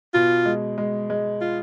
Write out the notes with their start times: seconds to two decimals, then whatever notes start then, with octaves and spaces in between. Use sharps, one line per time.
0.14 B2 F4
0.45 G#3
0.78 G#3
1.10 G#3
1.41 F4